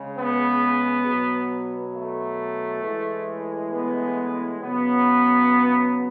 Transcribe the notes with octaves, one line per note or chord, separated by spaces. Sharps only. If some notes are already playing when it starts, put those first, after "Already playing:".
Already playing: C#3 G#3
B3
B2 F#3
A3
A2 E3 G#3
B3
C#3 F#3 B3